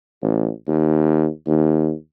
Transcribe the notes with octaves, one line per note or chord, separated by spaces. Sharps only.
A1
D#2
D#2